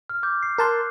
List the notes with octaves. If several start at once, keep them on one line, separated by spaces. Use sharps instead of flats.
F6
D6 G6
C7
A#4 A5 C6 F#6